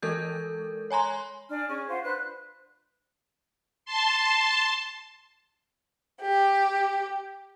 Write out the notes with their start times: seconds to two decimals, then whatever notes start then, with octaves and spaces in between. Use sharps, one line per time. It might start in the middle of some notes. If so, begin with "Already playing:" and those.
0.02 E3 G#3 A4 A#4 G6
0.90 C#5 G#5 A#5 C6
1.50 D4 G#5 F6
1.68 C#4 G#4 C#6
1.89 F4 C5 F5 F#5
2.03 D4 B4 C5 F#6
3.85 A5 C6
6.23 G4